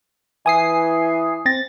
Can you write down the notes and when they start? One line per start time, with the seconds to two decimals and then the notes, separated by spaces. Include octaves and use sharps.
0.46 E3 G#5 D#6 C7
1.46 C4 A6 A#6